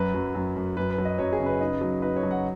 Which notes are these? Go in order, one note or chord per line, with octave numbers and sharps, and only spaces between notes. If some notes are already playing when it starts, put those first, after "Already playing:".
Already playing: F#2 F#3 B4
F#2
F#2
F#2
F#2 B4
B4
F#3
D#5
F#2 C#5
G#4
C#3
B4
D#4
F#3
D#4 B4
C#5
F#3
F#5